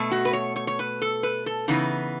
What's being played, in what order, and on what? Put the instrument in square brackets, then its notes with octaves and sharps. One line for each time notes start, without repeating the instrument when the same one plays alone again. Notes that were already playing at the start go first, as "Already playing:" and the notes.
Already playing: [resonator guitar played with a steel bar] B2 A3
F#4
B4
C#5
C#5
C#5
B4
A4
B4
A4
C#3 E3 B3 D#4